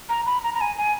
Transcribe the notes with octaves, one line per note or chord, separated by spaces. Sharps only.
A#5
B5
A#5
A#5
G#5
G#5